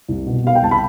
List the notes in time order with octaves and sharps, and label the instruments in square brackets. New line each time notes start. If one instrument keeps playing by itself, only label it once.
[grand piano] C2
B2
B3 F5
G5
C2 A5
B5